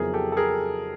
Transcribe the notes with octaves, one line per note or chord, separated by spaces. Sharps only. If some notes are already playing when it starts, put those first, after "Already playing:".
Already playing: F2 C#3 F#3 B3 E4 G#4 A#4
G4 A4
A4
G#4 A#4